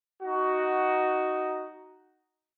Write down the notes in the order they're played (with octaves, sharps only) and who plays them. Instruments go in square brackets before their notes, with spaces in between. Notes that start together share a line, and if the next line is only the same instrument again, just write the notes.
[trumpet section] D#4 F#4